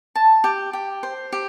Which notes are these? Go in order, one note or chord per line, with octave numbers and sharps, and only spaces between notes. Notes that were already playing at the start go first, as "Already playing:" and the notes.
A5
G4
G4
C5
G4